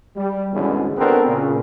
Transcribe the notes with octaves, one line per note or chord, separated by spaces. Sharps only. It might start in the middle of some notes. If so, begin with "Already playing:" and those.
G3
G#1 E2 G#2 B2 D3 C#4
B3 C4 D4 F#4 A4 A#4
A#2 C#3